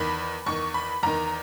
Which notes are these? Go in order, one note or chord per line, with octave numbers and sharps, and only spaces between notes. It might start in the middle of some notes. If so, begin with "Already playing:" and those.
Already playing: E2 D#3 B5
E2 D#3 C#6
B5
E2 D#3 A#5